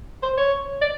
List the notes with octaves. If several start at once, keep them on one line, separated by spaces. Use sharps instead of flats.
C5
C#5
D5